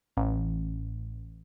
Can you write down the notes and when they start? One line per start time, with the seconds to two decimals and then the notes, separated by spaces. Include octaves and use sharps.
0.17 A1